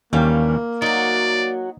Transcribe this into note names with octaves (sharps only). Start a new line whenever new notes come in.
D#2 E3 G3 A#3 C#4 F5 G5
F#3 D#4 F#4 D5